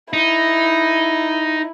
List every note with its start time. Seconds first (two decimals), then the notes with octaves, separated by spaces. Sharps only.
0.13 D#4 E4